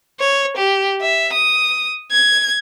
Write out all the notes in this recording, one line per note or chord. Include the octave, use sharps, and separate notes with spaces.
C#5
G4
E5
D#6
G#6